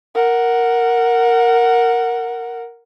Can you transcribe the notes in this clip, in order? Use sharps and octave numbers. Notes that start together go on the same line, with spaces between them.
A#4 F#5